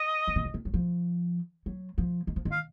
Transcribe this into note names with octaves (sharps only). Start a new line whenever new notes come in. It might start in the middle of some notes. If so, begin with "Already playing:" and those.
Already playing: D#5
F3
D#3
C#3
D#3
F#3
F3
F#3
F3
D#3
F3
D#3
F5